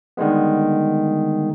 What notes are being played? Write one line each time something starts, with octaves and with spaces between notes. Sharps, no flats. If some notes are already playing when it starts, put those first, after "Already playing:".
D3 D#3 G3 G#3 B3